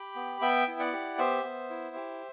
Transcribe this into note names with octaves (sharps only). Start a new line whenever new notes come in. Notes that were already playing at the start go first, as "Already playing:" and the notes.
Already playing: G4 G5 B5
B3
B3 E5 G5
E4
D5 F#5
G4
B3 C5 E5
B3
E4
G4